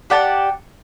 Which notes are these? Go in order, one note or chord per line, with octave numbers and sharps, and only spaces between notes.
G4 D5 F#5 A5